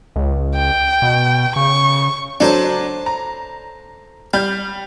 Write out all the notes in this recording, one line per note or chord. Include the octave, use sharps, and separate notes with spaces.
C#2
G5
B2
C#3 C#6
F#3 D4 A4 C5 A5
A#5
G3 F5 G6